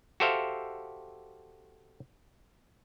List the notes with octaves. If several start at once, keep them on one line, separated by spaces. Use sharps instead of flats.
F#4 G4 A4 C5 E5 F5